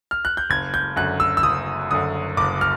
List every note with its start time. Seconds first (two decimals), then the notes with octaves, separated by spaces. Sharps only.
0.11 F6
0.25 F#6
0.37 G6
0.50 F#1 G#6
0.74 G6
0.96 F#2 D3 F#6
1.20 E6
1.37 E6
1.43 F#1 D#6
1.91 F#2 D3 D#6
2.37 F#1 D6
2.61 F6